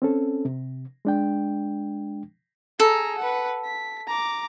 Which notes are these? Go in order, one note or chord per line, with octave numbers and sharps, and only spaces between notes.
C4 C#4 A4
C3
G#3 D4 G5
G#4 A4 A#5
B4 F#5
B6
A#5 D6